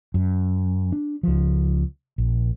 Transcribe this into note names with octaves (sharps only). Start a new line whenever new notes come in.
F#2
D4
C#2 F3
A#1